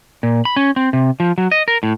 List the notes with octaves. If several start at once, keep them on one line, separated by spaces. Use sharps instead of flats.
A#2
B5
C#4
C4
C3
F3
F#3
D#5
A#4
A2